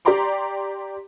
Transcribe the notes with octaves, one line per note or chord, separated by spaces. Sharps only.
G4 D5 G5 A#5 C6 D6